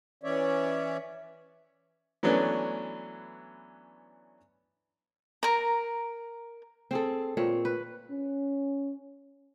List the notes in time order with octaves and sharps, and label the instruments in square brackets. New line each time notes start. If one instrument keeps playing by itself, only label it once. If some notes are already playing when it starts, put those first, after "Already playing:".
[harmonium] E3 C#4 C#5 D5 E5
[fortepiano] E3 F#3 A3 B3 C#4 D4
[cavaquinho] A#4 A#5
[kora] C4 G#4 A4
A#2 C4 C#5
B4
[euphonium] C#4